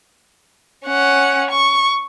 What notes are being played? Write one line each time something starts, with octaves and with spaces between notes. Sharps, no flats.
C#4 F#5
C#6